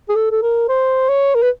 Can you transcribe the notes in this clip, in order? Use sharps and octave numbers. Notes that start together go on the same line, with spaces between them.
G#4
A4
A4
A#4
C5
C#5
A#4
B4